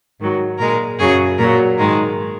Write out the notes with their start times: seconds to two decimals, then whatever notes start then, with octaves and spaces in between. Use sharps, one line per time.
0.19 G#2 D#3 F#3
0.59 A#2 G#3 A#4
0.99 F#2 C#3 F#3 G#4
1.39 A#2 F#3 A#4
1.78 G#2 D#3 G#3 A#4